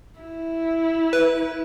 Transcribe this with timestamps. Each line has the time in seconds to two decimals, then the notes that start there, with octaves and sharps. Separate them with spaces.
0.20 E4
1.13 B4